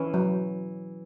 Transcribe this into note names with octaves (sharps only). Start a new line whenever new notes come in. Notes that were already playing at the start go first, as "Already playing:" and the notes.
Already playing: E3 C#4
F#3